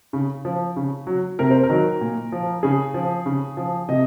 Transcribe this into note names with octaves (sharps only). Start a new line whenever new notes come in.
C#3
F3
C#3
F#3
C3 A#4
C5
A#4
D#3 F#3
A#2
F3
C#3 G#4
F3
C#3
F3
C3 D#5